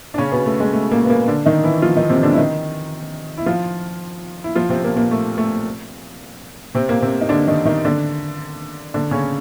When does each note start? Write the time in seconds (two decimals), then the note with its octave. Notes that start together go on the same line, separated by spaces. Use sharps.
0.14 D4
0.18 C#3 C#4
0.32 B2 B3
0.46 A3
0.60 G#3
0.73 A3
0.92 A#2 A#3
1.04 B3
1.10 A#2 A#3
1.28 D3 D4
1.46 D#3 D#4
1.64 E3 E4
1.82 F3 F4
1.97 D#3 D#4
2.09 C3 C4
2.23 D3 D4
2.32 E4
2.37 D#3 D#4
3.37 E4
3.46 F3 F4
4.44 E4
4.55 F3 F4
4.69 C3 C4
4.84 A#2 A#3
4.97 A#2 A#3
5.11 A3
5.38 A3
6.75 C3 C4
6.88 A#2 A#3
7.02 C3 C4
7.21 D#4
7.29 D3 D4
7.48 D#3 D#4
7.65 D#3 D#4
7.85 D3 D4
8.94 D3 D4
9.11 C#3 C#4